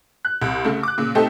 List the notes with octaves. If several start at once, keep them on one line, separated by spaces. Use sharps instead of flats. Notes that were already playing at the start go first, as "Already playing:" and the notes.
F#6
C2
C#3 A3
D6 F#6
A#2 C#3
A3 C4 D#4 G4 A4